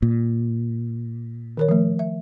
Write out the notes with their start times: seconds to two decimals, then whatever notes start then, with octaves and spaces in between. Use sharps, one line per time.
0.02 A#2
1.57 D#3 A#4 C#5
1.69 F3 A3
1.99 E5